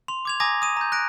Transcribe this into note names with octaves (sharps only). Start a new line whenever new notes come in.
C6 F7
D6 G#6 F7
G#5 A#5 D6 D#6 G#6 A#6
D#6 D#7
A#5 G6
F#6 A#6 D7